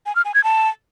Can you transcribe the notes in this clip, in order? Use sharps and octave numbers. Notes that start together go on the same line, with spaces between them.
G#5
F6
G#5
G#6
A5